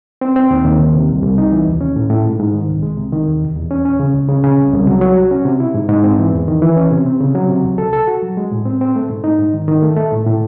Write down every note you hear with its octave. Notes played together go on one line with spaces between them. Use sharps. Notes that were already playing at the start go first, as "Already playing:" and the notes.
C4
C4
D#2
D#2
D#3
C3
C2
C2
D#4
E3
D#2
C#4
A2
A2
G#2
G#2
D#3
C2
G#3
C3
D#3
D#2
E2
E2
C#4
C#4
C#3
C#2
C#3
C#3
C2
C2
F#3
F#3
F#4
C#4
C3
E4
G#2
G#2
C4
E3
E2
D#3
E3
C#4
C3
C4
C#3
F#3
C3
C#2
A4
A4
F#4
F#3
G#3
A2
C4
C4
A3
G#2
D#4
G#2
D#3
D#3
A3
A3
A2
A2